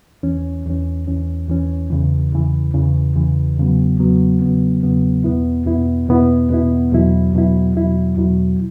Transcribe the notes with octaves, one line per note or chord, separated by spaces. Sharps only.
E2 E3 C#4
E2 E3 C#4
E2 E3 C#4
E2 E3 C#4
E2 C#3 E3
E2 C#3 E3
E2 C#3 E3
E2 C#3 E3
E2 C#3 F#3 B3
E2 C#3 F#3 B3
E2 C#3 F#3 B3
E2 C#3 F#3 B3
E2 B2 B3 E4
E2 B2 B3 E4
E2 B2 B3 E4
E2 B2 B3 E4
E2 B2 F#3 E4
E2 B2 F#3 E4
E2 B2 F#3 E4
E2 B2 F#3 E4